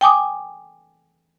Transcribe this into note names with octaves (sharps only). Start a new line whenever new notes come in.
G5 G#5 D6 D#6